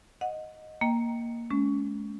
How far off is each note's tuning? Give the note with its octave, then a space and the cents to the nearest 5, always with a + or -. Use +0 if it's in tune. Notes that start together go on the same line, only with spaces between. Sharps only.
D#5 +0 F#5 -25
A#3 +0 D#5 +10 G5 +0
G#3 +35 C#4 +20